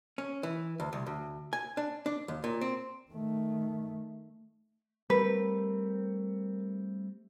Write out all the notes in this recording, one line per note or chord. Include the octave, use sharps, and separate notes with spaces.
C#4
E3
D2
C2
D2
G#5
D4
D4
D#2
A#2
C4
D#3 A3
G3 A3 C4 A#4 B4